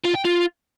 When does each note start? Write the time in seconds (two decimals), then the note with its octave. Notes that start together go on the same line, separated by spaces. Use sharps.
0.05 F4
0.15 G5
0.25 F4